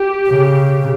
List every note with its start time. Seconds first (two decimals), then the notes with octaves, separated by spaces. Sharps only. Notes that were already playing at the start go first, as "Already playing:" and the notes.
Already playing: G4
0.29 C#3